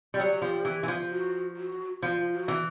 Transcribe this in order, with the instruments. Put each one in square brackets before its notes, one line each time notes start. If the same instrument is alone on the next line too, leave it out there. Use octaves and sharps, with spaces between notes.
[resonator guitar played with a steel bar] G3
[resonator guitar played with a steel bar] F#3 [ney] G4
[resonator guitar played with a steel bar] F3
E3
E3
F3
[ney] F#4
F#4
[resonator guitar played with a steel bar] F3 [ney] F4
[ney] F#4
[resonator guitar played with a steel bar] E3